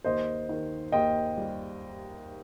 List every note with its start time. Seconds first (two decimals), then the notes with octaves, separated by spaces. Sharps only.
0.04 D#2 C5 D#5
0.49 D#3
0.92 D#2 D#5 G5
1.37 G3